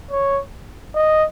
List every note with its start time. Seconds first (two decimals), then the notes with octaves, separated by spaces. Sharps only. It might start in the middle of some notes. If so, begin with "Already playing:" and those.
0.11 C#5
0.95 D#5